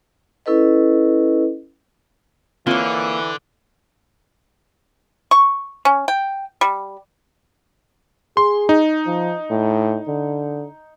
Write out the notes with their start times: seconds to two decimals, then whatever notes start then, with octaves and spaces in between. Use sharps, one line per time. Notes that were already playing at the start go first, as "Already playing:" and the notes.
0.46 C#4 E4 A4 B4 D#5
2.67 D3 E3 A#3 C4 F4 C#5
5.31 C#6
5.85 C#4
6.08 G5
6.61 G3
8.37 G#4 C6
8.69 D#4
9.06 F3
9.50 A2
10.08 D3